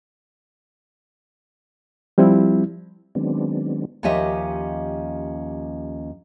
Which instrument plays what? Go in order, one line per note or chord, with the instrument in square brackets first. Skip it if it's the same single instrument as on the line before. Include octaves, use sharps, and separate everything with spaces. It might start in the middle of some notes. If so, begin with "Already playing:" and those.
[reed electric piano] F3 G3 C4 E4
[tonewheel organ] D#3 F#3 G#3 B3 C4 D4
[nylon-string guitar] D#2 F3 C#4 G4 D#5 E5